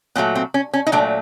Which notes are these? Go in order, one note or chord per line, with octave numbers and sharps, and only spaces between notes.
A#2 F#3 A3 B3
C4
C#4
C#4
D#4
A#2 F#3 A3 D4